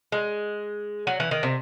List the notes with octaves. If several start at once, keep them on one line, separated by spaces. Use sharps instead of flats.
G#3
F#3
E3
D#3
C3